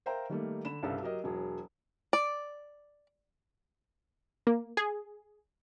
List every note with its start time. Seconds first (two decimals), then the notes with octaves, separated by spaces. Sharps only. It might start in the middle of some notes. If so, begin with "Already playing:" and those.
0.06 A#4 C5 E5 F5 G5 A#5
0.29 D#3 G3 A3 A#3
0.65 D3 B5 E7
0.83 C2 G2 C#3 A4 F5
1.03 F#3 G4 A#4 D#5
1.24 E1 F#3 G#4
2.13 D5
4.47 A#3
4.77 G#4